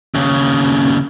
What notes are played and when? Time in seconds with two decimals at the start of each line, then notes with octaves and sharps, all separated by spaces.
0.15 D#2 C#3